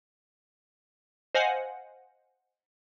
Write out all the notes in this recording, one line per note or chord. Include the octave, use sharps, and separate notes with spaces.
C5 D#5 F5 F#5 G#5